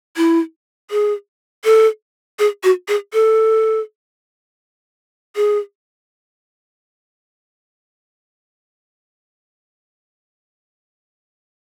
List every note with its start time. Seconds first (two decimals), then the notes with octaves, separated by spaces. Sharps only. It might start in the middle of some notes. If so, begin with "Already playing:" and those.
0.17 E4
0.91 G#4
1.64 A4
2.39 G#4
2.63 F#4
2.88 G#4
3.13 A4
5.36 G#4